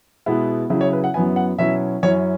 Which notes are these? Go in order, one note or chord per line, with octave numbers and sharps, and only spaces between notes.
B2 G#3 B3 E4
C#3 F#3 E4
C#5
B4
F#5
F#2 F#3 B3 E4 G#5
F#5
B2 F#3 C#4 E4 E5
F#2 F#3 C#4 E4 C#5